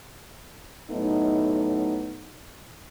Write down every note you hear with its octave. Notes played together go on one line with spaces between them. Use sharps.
A2 F#3 A3 B3 D#4